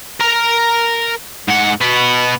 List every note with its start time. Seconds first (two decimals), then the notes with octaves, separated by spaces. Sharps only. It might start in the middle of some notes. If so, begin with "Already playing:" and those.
0.20 A#4 A#5
1.48 G#2 F#5
1.81 B2 B3